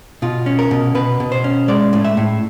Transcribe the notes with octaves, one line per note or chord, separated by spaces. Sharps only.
B2 F4
C#4
A#4
B2
B2 B4
B2
C5
C#4
G#3 D5
A2
E5
A2